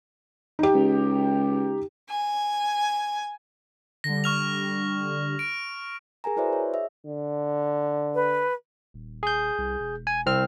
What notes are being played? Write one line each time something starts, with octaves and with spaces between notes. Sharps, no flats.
D#4 G4
C#2
G#5
D3 G3 A#6
C#6 F6 F7
D7
G#4 A#4 G#5 A#5
E4 F#4 B4 C5 D5 E5
C#5
G#4 D#5 E5
D3
B4
D#1
G#4 G6
C2
E1
G#5
C2 C4 F6